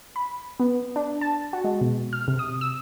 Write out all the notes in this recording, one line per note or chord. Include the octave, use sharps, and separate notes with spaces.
B5
B3
D4
A5
F#4
G#3
B2
F6
C3
D#6
E6